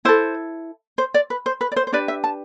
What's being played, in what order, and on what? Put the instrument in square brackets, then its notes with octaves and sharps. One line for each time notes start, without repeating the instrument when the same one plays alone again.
[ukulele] E4 A4 C5
C5
D5
B4
C5
B4
D5
C5
C5
D4 G4 B4 D5
E5
A5